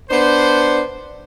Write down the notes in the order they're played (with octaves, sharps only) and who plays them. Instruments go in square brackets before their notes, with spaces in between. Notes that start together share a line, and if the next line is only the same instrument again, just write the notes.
[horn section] B3 D4 C5